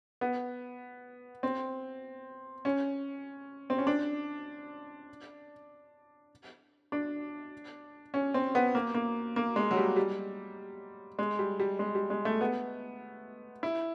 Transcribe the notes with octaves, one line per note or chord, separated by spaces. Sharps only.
B3
C4
C#4
C4
C#4
D4
D4
C#4
C4
B3
A#3
A#3
A#3
G#3
F#3
G3
G3
G#3
G3
G3
G#3
G3
G#3
A3
B3
E4